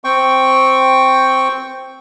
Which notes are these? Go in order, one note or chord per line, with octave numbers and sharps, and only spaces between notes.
C4 G5 C#6